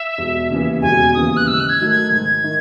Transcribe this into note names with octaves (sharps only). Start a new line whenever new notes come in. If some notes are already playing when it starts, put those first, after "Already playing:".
Already playing: E5
E1
D#2 C#3 E3
E1 G#5
D#2 C#3 E3 D#6
F#6
G#2 E6
F#6
G#6
D#3 F#3 A3
G#6
G#2 G#6
D#3